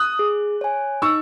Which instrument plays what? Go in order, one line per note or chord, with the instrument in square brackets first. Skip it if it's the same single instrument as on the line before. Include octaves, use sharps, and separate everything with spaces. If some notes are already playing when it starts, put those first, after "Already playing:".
Already playing: [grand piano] D#6 F#6
[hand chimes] G#4
C#5 G#5
[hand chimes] D#4 [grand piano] C#6 E6